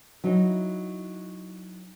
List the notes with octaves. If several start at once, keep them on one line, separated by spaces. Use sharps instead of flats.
F#3 D#4 E4